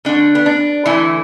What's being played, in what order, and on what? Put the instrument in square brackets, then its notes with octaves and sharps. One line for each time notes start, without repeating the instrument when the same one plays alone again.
[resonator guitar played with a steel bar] D3 A3 D4
B3
D4
D3 E3 A3 E4